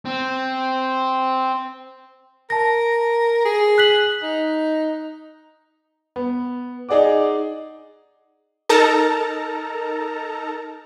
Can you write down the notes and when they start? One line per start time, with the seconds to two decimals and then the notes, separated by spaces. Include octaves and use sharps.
0.05 C4
2.50 A#4 A5 A#6
3.45 G#4
3.78 F#6 B6 F#7
4.22 D#4
6.16 B3
6.89 D#4 G#4 D5 F#5 D6
8.69 D#4 A4 A#4 A5 A#5